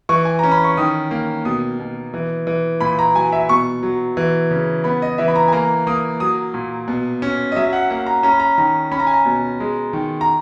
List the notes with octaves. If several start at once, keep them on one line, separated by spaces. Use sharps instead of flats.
E3 C#6
G#5
C#4 A#5
B5
C#6
D#3 D#6
A#3
B2 D#6
B2
E3
E3
A#2 B5
A#5
F#3 G#5
E5
B2 C#6
F#3
E3
C#3
B3 B5
D#5
E3 E5
B5
A#5
G#5
A#3 A#5
A#3 D#6
F#3 D#6
A#2
B2
C#4
D#5
F#3 E5
F#5
A#3 F#5
A#5
C#4 A#5
B5
A#5
D#3 A#5
C#4 B5
A#5
G#5
A#5
B2
G#3
D#3
A#5